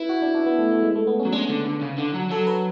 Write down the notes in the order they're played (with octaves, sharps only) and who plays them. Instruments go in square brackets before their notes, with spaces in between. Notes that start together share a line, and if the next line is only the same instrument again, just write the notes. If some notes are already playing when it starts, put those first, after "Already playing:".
Already playing: [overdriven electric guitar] E4 [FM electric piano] B4
[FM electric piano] F#4
D4
D4
B3
A3
A3
G#3
A3
B3
C#4
[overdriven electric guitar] F#3
[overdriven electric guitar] G#3 [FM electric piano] D4
[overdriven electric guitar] D3
D3
C#3
D3
F#3
[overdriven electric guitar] F#3 [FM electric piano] A4
[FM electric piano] B4